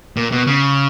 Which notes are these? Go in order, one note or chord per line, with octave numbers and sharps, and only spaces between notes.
A#2
B2
C#3